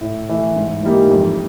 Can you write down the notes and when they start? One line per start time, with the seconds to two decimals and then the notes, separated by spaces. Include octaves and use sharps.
0.01 A2
0.29 E3 A3
0.56 G#2
0.83 E3 G3 A#3 D#4
1.11 F2